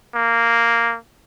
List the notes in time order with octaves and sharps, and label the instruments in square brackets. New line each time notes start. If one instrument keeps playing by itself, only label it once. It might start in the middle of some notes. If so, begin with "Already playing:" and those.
[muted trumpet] A#3